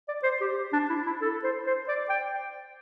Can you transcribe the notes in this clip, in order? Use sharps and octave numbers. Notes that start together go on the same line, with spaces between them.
D5
C5
G4
D4
E4
E4
A4
C5
C5
D5
G5